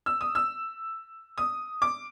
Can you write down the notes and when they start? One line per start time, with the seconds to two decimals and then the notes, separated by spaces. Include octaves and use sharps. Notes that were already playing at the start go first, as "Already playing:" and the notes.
0.06 E6
0.21 D#6
0.35 E6
1.38 D#6
1.82 D6